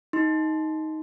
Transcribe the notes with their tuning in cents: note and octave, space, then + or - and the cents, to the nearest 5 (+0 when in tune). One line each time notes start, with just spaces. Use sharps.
D#4 +10 C6 +0